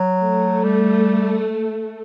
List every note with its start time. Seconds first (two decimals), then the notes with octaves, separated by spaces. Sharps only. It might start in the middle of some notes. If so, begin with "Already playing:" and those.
Already playing: F#3
0.20 A3
0.63 G3